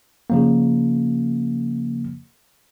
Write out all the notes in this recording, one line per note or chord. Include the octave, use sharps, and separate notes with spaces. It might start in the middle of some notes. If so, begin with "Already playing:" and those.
C#3 F3 A#3